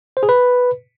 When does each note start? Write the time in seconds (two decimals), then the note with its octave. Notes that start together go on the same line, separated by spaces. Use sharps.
0.17 C5
0.23 G#4
0.29 B4